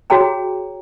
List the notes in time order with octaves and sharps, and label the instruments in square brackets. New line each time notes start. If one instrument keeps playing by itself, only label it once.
[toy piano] F#4 G#4 C#5 G5 A#5